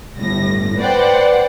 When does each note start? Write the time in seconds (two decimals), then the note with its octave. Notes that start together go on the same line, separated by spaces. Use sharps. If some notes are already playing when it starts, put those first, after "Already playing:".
0.18 G1 A2 A#6
0.78 B4 C5 D5 F#5 G5